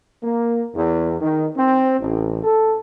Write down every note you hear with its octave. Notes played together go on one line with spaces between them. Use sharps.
A#3
E2
D#3
C4
A1
A4